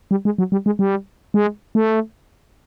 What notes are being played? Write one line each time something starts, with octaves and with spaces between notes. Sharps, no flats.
G3
G#3
F#3
G3
G#3
G3
G#3
A3